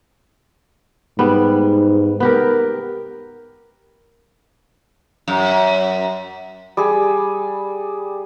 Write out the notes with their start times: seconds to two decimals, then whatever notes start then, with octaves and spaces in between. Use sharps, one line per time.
1.19 G#2 G3 B3
2.20 B3 G4 A#4
5.28 F#2
6.77 G3 G#4